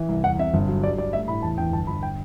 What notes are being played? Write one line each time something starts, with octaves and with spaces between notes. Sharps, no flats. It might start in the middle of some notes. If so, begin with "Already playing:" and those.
Already playing: E3
C2
E2 F#5
C3 E5
G1
F#3
G3 D5
G3 D5
A3 E5
A2 B5
E2 A5
E2 G5
G1 A5
G1 B5
G5